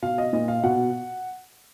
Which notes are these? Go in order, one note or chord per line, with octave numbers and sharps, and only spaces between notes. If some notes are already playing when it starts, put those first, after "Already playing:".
B2 F5
D#5
A#2 D#5
F5
B2 F#5